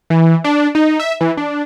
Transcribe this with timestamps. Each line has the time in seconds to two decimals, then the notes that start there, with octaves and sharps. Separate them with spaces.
0.10 E3
0.44 D4
0.75 D#4
1.00 E5
1.21 E3
1.37 D4